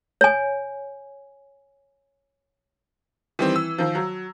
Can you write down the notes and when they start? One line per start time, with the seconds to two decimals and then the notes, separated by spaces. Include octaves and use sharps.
0.21 C#5 G#5
3.39 D#3 E3 G3 C4
3.56 E6
3.78 D#3 F3
3.95 F#3